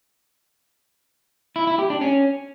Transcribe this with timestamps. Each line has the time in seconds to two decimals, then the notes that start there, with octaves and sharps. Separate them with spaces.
1.56 E4
1.67 E4
1.79 G4
1.90 D4
2.01 C#4